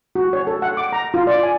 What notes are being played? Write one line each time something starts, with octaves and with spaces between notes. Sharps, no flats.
F#4
C#5
A4
F#5
D6
A#5
F4
D5
G#5